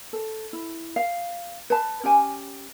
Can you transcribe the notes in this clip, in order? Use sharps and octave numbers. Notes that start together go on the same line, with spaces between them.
A4
E4
F5
B4 A5
C#4 G4 G#5